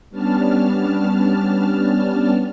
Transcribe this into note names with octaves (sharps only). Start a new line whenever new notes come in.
G3 B3 C#4 D4 A5 F6